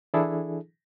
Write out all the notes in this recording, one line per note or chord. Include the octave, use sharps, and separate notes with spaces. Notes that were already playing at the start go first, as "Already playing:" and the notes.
E3 D4 E4 G#4 A4